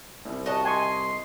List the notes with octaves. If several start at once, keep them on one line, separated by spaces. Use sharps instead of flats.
C2
F#4 D#5 A5
G#5 C6 C#6